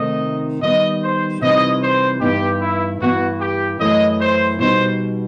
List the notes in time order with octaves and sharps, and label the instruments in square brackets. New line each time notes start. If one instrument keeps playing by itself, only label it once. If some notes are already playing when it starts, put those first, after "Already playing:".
Already playing: [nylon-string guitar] C3 D#3 A3 D#4 [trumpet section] D#5
[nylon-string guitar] D#3 G3 B3 D#4 [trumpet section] D#5
[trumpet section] C5
[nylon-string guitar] C3 E3 G3 D#4 [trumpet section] D#5
[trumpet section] C5
[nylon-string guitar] G2 E3 B3 D#4 [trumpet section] G4
[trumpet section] E4
[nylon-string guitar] G2 E3 B3 [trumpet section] F#4
[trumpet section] G4
[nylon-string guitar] F#2 E3 A3 E4 [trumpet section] D#5
[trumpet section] C5
[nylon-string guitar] B2 G3 B3 D#4 [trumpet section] C5